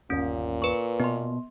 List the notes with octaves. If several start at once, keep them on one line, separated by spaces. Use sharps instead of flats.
G1 D#2 A#2 C#4
B4 C#6
B2 B3 C6